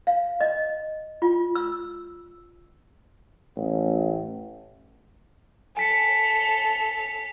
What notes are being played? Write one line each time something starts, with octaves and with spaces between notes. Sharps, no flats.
F5
D#5
F4
E6
A1
A4 G#5 B6 C#7 F7